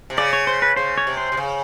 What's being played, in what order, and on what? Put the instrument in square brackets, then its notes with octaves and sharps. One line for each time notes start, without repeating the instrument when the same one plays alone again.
[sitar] C3
[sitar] C#3 [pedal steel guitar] D5
[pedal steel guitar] C#5
C5
B4
[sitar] C#3 [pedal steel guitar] C5
[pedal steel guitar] C#5
[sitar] C3
[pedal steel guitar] C5
[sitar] C3
C#3